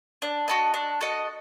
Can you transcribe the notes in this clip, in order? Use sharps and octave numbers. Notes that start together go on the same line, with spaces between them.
D4
F#4 A4 D#5
D4
F#4 A4 D#5